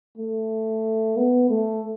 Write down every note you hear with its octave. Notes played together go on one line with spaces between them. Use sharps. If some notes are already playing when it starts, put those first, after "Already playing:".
A3
B3
A3